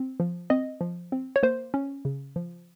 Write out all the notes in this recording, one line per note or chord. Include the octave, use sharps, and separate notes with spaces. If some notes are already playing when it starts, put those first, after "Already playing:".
Already playing: C4
F3
C4 D#5
F3
C4
C#5
A#3 C5
C#4
C#3
F3